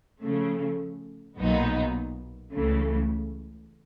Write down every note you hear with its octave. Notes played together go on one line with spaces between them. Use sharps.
C#3 F3 A3
B1 A#2 F#3 B3 D#4
C#2 C#3 E3 A3